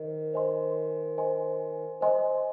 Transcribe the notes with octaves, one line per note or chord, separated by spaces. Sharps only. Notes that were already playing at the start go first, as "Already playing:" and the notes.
Already playing: D#3 C5 D#5
C5 D#5 G#5 C6
C5 D#5 G#5 C6
C5 D#5 G#5 C6